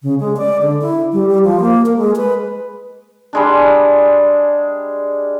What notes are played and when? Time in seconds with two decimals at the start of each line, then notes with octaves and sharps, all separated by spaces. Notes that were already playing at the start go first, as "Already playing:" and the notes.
0.03 C#3
0.20 G#3
0.37 D5
0.62 D3
0.82 E4
1.13 G3
1.29 G3
1.44 F3
1.60 A#3
1.86 A#4
1.97 G#3
2.16 B4
3.33 G3 G#3 D4